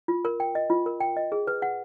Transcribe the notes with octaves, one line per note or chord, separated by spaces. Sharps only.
F4
A#4
G5
D#5
F4
A#4
G5
D#5
G#4
B4
F#5